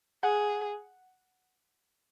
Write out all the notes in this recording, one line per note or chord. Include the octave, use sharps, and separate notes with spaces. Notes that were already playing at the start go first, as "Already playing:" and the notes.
G#4 F#5